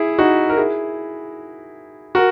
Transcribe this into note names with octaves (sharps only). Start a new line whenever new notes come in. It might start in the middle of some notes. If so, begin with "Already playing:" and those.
Already playing: E4 G#4
D#4 F#4
A#4
E4 G#4
F#4 A#4